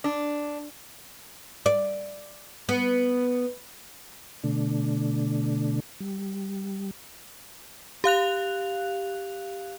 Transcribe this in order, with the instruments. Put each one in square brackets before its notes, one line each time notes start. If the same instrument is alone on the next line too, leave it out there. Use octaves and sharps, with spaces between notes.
[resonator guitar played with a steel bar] D4
[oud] D5
B3
[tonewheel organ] B2 D3 A3 D4
G3
[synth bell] G4 F5 F#6 F7